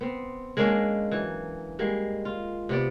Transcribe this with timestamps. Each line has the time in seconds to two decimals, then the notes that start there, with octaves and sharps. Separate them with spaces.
0.01 B3 C4
0.57 G#3 A#3 C#4 D4
1.12 E3 F#3
1.79 G3 G#3 A#3
2.25 F4
2.69 C3 B3 D5